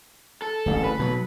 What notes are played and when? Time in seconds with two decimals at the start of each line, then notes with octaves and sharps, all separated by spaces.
0.42 A4
0.66 D1 A1 G2
0.84 B4
1.00 B2 F#3